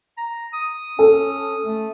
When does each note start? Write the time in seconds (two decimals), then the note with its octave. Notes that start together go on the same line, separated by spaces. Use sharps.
0.18 A#5
0.54 D#6
0.99 C#4 A4
1.66 A3